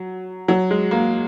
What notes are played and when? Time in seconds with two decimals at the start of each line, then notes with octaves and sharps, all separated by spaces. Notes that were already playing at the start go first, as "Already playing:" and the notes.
Already playing: F#3
0.48 F#3
0.71 G#3
0.91 A#3